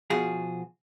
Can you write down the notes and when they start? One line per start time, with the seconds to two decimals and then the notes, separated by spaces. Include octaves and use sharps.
0.10 B2 F3 F4 F#4 G#4